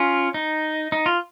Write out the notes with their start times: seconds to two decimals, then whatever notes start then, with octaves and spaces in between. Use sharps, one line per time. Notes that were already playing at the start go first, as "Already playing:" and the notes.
Already playing: C#4 F4
0.34 D#4
0.92 D#4
1.06 F4